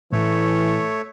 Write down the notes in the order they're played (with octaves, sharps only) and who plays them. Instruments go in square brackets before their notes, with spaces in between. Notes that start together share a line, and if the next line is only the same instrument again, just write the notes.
[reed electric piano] A2 [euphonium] E3 [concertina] A3 C#5